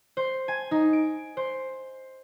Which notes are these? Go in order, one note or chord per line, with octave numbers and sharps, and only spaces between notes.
C5
G#5
D#4
D7
C5